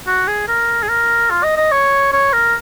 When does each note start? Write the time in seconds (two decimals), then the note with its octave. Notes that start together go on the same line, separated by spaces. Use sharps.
0.07 F#4
0.27 G#4
0.48 A#4
0.82 G#4
0.89 A#4
1.30 F4
1.44 D#5
1.57 D#5
1.71 C#5
2.13 C#5
2.33 A#4